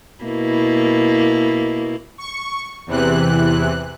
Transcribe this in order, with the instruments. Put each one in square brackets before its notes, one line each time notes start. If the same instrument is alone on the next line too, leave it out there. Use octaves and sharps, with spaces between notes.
[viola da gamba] B2 A#3 E4
[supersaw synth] C#6
E2 C3 E3 F#6